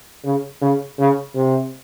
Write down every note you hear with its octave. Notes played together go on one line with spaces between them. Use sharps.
C#3
C#3
C#3
C3